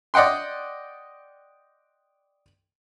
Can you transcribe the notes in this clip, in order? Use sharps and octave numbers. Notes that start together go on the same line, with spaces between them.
D5 D#5 F#5 G5 C6